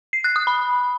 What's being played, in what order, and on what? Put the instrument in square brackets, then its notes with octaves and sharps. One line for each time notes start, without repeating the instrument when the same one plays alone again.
[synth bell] C7
F#6
D#6
B5